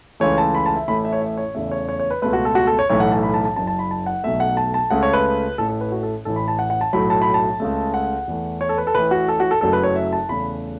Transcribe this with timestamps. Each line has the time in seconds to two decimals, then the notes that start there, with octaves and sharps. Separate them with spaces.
0.20 C#2 C#3 E3 A3 C#5
0.38 A5
0.55 B5
0.66 A5
0.76 E5
0.88 A1 A2 E3 A3 B5
1.05 E5
1.13 C#5
1.22 E5
1.38 C#5
1.55 E2 C#3 A3 E5
1.72 C#5
1.89 C#5
2.00 C#5
2.11 B4
2.22 C#2 B2 A3 B4
2.33 F#4
2.45 A4
2.55 F#4
2.67 A4
2.79 C#5
2.90 B1 A2 E3 A3 C#5
3.00 F#5
3.12 A5
3.23 B5
3.34 A5
3.45 A5
3.56 F#1 F#2 C#3 A5
3.67 A5
3.79 B5
3.91 A5
4.06 F#5
4.24 B1 B2 A3 E5
4.40 F#5
4.57 A5
4.74 A5
4.90 C#2 C#3 A3 F#5
5.03 C#5
5.13 B4
5.58 A1 A2 A3 A4
5.69 A4
5.81 B4
5.92 F#4
6.03 A4
6.25 A1 A2 E3 A4
6.36 B5
6.48 A5
6.59 F#5
6.70 F#5
6.81 A5
6.93 B1 A2 F#3 A3 B5
7.10 A5
7.22 B5
7.34 A5
7.60 C#2 C#3 A3
7.94 F#5
8.28 E2 E3 A3
8.61 C#5
8.69 A4
8.78 B4
8.87 A4
8.94 A1 A2 E3 B4
9.11 F#4
9.28 A4
9.40 F#4
9.51 A4
9.61 F#1 F#2 F#3 A3 A4
9.73 B4
9.83 C#5
9.96 E5
10.13 A5
10.29 E2 C#3 A3 B5